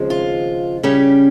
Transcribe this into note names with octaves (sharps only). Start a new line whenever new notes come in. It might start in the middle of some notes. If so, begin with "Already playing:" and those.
Already playing: D#2 C#3 F3 G#3 C4
F4
C#3 G3 C#4 G4